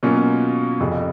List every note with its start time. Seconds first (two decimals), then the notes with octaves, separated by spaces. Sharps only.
0.03 B2 F#3 A#3 C#4 F4
0.80 F1 F2 C#3